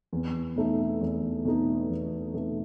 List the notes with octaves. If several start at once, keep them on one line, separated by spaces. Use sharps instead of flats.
E2
B2 A3 D#4
E2
B2 A3 D#4
E2
B2 A3 D#4